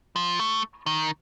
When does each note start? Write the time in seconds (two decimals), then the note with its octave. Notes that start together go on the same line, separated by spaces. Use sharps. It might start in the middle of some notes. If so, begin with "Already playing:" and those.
0.16 F3
0.39 A3
0.86 D#3